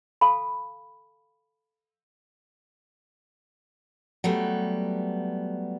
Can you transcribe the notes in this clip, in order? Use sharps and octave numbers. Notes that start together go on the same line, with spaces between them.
A4 F5 A5 B5
F#3 G3 A3 B3